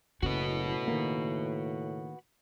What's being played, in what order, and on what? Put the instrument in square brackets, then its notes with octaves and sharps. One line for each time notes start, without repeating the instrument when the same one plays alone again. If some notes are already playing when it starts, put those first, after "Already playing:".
[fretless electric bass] F#1 [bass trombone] A2 [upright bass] C#3 [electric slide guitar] F#4 B4
[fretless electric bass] D#3 A#3